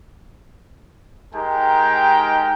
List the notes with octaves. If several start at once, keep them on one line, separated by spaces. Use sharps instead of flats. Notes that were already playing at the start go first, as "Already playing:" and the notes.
G#3 D#4 G4 A#4 G5